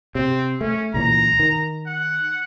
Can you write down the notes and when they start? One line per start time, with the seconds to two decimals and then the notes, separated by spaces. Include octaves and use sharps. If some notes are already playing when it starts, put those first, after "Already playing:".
0.15 C3 C4
0.61 A3 C#4
0.94 C#2 A#2 E3 A#5
1.39 D#3
1.86 F#5